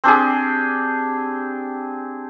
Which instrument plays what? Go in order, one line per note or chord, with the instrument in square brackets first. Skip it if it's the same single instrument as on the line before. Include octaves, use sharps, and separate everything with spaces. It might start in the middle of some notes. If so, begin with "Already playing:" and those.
[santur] C4 D4 G4 G#4